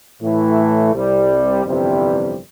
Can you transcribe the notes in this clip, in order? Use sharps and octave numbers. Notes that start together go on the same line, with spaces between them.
A2 E3 A3
C2 C3 G3
G1 F2 C3 E3 G3